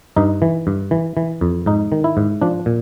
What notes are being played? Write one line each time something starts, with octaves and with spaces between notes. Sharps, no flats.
G2 D#4
E3
G2
E3
E3
F2
G#2 D#4
D#3
E4
G#2
F3 D4
A#2